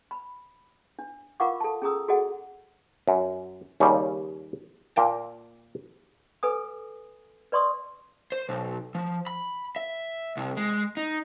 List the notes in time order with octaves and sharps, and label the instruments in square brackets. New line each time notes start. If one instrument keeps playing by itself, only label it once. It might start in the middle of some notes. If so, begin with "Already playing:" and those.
[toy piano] B5
D4
F4 A#4 F5 F#5 C#6 D6
A4 A5
C#4 G#4 A#5 D#6 E6
F#4 G#4 A4 D#5 F#5
[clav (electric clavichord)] F#2
D#2 C#3 G3
A#2 A#3 G5 A5
[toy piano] A4 B4 G#5 D#6
B4 D5 C6 C#6 D#6
[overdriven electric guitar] C5
B1
F3
B5
E5
C2
G#3
D#4